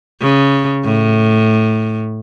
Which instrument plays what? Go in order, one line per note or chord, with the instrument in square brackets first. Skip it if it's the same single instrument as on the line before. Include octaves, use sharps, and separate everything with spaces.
[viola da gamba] C#3
A2